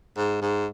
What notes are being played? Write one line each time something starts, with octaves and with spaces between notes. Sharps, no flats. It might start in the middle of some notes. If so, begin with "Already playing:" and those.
G#2
G#2